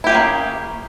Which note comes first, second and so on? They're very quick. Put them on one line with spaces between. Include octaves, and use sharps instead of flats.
E4 G4 G#4 C#4 A#3